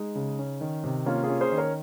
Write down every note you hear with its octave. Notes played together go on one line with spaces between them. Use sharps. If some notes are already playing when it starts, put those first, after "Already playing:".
Already playing: G#3 D#4
C#3
C#4
D#3
C3
A#3 C#4 F4
F4 G#4
C#4
G#4 C5
D#3
A#4 C#5